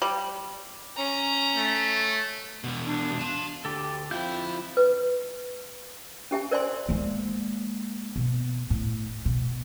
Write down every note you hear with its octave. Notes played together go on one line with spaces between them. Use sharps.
G3
C#4 A#5
A3
E2 B2
D4
F5 A5
D2 G4 A4
F3 C4 E4 F4 G5 G6
B4
C#4 G4 E5 G#5
A#4 C5 D5 E5 G#5 C6
G#3 A#3
B2
A2
B2